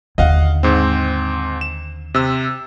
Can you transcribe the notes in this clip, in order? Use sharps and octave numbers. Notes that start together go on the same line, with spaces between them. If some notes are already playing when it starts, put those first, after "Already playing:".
D#2 D3 D#5 F5 F#5
G#2 C4
E7
C3 E6